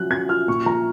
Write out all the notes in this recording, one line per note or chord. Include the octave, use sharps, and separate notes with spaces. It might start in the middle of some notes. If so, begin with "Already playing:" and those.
Already playing: F3 F#3 C#4 F#6
C#4 G#6
F4 F6
A#2 C#6
F3 A#5